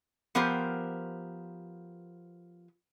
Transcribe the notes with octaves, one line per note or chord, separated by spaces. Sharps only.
F3 B3 G4 A#4 C5